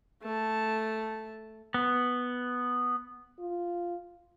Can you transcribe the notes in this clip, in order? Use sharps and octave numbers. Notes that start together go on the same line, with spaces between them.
A3 A5
B3
F4